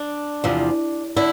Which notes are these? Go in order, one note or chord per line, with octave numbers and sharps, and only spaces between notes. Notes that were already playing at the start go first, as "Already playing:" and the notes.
Already playing: D4
E2 C3 F3
D3 E4